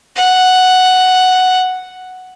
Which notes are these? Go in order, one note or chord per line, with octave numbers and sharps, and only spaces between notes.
F#5